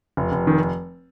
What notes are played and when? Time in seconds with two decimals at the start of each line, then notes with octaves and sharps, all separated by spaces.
0.17 F1
0.32 F1
0.47 D#3